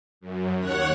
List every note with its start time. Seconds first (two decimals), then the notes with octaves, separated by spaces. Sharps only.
0.21 F#2
0.59 D#2 C#5 F#5 F#6